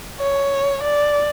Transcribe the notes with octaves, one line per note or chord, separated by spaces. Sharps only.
C#5
D5